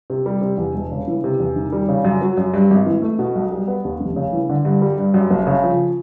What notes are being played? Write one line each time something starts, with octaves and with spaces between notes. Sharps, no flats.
C3
G3
C3
E2
E1
C#3
E3
C3
E2
D#3
G3
C#3
F#2
F#3
F#2
G2
G#1
E3
A3
B2
B1
G3
B3
D#2
F1
C#3
E3
D3
G2
G3
G2
F#2
F#1
C#3
F3